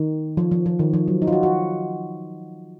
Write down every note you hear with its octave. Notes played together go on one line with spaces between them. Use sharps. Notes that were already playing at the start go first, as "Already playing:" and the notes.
Already playing: D#3
F3
F3
F3
D#3
F3
F#3
D#4
F4
F#4
F#4